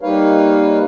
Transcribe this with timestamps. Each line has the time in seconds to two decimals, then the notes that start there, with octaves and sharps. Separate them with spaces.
0.01 G3 A#3 D#4 B4 C#5 F5